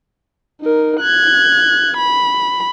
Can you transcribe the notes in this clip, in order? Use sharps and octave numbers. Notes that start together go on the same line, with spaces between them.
D#4 A#4
F#6 G#6
B5